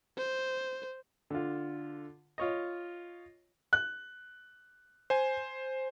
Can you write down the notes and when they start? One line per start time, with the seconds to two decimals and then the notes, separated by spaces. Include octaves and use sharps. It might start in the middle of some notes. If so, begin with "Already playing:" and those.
0.17 C5
1.30 D3 F4
2.38 F4 C#5 D#5
3.73 F#6
5.10 C5 G#5